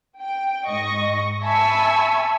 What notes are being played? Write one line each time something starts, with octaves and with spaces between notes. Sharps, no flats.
G5
G#2 D#5 C#6 A#6
E5 G#5 A5 B5 C#6 E6